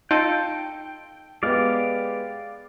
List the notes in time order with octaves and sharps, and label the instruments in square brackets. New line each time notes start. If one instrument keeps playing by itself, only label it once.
[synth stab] D#4 [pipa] F4 A4 [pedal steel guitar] G5
[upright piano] G#3 B3 G4 [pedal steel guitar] D5 F5